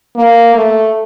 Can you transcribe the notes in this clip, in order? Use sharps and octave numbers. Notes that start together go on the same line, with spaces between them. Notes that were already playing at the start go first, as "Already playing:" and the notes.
A#3
A3